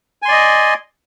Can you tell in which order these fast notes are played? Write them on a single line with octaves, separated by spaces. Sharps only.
G#5 C6 D5 D#5